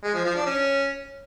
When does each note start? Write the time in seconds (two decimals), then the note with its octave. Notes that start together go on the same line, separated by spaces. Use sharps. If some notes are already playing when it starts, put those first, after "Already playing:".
0.04 G#3
0.14 F3
0.25 F3
0.35 D4
0.46 C#4